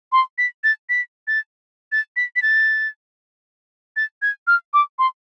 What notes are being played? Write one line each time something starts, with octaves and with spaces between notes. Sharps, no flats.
C6
B6
A6
B6
A6
A6
B6
B6
A6
A6
G#6
F6
D6
C6